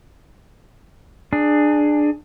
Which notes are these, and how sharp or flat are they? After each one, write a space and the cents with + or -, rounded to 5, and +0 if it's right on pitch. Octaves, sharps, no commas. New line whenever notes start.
D4 +15 G#4 +0